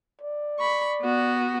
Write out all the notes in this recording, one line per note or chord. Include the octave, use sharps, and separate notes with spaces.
D5
B5 C#6
B3 F#4